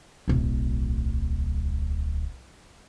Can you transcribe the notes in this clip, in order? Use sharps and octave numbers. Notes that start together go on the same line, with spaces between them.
D1 B1